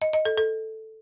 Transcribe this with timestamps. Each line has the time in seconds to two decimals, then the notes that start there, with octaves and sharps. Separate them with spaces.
0.02 D#5
0.13 D#5
0.25 A4
0.37 A4